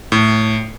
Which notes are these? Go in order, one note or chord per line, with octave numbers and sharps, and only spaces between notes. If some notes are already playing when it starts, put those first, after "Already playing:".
A2